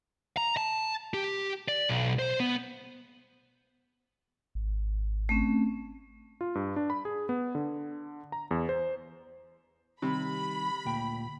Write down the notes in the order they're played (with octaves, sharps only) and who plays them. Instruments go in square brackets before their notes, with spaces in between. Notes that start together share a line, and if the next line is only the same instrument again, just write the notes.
[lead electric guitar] A#5
A5
G4
D5
B1
C5
B3
[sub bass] G#1
[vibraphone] A3 C4 C#4
[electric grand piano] F4
G2
D4
B5
G#4
B3
D3
A#5
E2
C5
[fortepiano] C3 [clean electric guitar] D#3 G3 [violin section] B5
[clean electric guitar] D2 A#2 G5